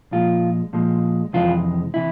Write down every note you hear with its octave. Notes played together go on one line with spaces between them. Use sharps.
A#2 F3 G#3 F4
A#2 F3 G#3
F2 C3 E3 G#3 F4
C3 E3 E4